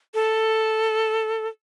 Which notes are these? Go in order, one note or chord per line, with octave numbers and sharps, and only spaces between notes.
A4